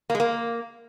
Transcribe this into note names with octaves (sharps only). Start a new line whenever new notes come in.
A#3
G#3
A#3